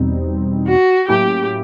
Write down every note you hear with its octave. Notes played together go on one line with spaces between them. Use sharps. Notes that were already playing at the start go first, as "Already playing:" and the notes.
Already playing: E2 B2 G3 C4 D#4
F#4
A2 F#3 A#3 C#4 E4 G4